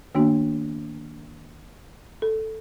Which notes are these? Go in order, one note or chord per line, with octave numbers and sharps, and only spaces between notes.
D#3 A#3 B3 D4 F#4
A4